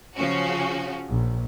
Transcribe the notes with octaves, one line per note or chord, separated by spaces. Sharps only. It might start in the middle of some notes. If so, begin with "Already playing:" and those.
C#3 F3 C#4 F#4
A#1